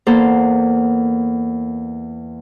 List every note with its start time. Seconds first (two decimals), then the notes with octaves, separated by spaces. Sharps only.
0.07 E2 A#3 A4 C5